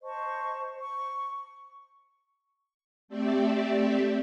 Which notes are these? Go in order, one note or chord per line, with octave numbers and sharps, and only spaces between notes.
C5 D#5 A5 C#6
C#6
A3 C4 G4 D5 E5